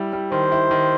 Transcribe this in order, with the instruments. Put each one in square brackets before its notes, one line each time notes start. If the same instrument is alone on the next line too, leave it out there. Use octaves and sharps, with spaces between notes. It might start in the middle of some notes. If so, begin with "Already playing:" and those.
Already playing: [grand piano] G3 E4
G3
[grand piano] D#3 [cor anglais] C5
[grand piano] E4
D#3